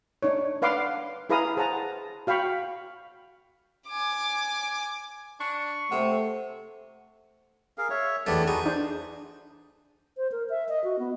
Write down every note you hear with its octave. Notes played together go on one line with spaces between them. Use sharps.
D4 D#4 C#5
D4 B4 F5 F#5 C6 D6
E4 G#4 B4 F5 A#5 D#6
G#4 C5 F#5 A5 A#5
F#4 F5 G5 B5 C#6
G#5 D6
D4 C#6
C3 A3 C5 F#5
G#4 A#4 F5
C#5 E5
E2 A3 B3 D4 G4
D#4 F#4 G#4 B4
D4 C5
C5
A#4
E5
D#5
F#4
B3